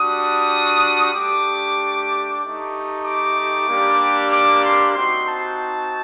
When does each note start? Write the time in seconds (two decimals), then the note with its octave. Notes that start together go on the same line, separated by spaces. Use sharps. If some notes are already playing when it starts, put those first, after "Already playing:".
Already playing: G3 D4 F#4 D#6
1.13 A3 D4 G4 D6
2.40 A3 D#4 G4
3.04 D6
3.67 G3 A#3 D4 G4
4.32 D6
4.63 C6
4.95 C4 D#4 F#4 C6
5.27 A5